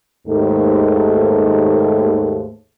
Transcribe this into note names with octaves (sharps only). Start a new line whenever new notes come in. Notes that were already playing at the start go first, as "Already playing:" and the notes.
D#2 G#2 A3